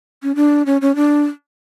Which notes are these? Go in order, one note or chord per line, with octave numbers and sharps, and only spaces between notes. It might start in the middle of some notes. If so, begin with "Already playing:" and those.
C#4
D4
C#4
C#4
D4